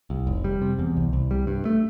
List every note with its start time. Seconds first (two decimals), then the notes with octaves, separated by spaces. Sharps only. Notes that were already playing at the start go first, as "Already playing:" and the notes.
0.10 C2
0.27 F1
0.44 G3
0.62 C3
0.79 E2
0.97 C2
1.13 C2
1.31 G3
1.47 G2
1.65 A3